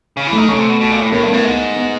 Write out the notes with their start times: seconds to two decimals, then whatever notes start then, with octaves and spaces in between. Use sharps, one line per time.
0.17 C#3
0.27 E3
0.32 A3
0.38 D#3
0.49 C#3 A3
0.59 C3
0.69 B2
0.81 B2
0.91 A#2
1.02 A2
1.12 A2 A#3
1.23 G2
1.28 B3
1.34 A2
1.44 G#2
1.76 B3